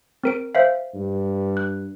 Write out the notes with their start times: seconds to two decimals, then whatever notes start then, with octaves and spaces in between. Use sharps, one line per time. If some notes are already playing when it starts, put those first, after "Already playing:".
0.24 C4 A#4 D7
0.55 C5 E5 F5
0.94 G2
1.57 F#6